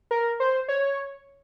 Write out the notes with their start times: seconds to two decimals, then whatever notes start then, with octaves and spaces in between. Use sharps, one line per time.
0.11 A#4
0.40 C5
0.68 C#5